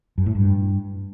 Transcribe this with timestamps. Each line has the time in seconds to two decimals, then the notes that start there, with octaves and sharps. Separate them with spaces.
0.18 F#2
0.26 A2
0.35 G2